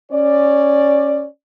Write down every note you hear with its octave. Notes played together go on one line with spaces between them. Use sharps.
C#4 D5